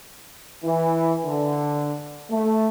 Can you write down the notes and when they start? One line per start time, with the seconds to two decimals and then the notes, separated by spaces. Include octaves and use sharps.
0.65 E3
1.25 D3
2.30 A3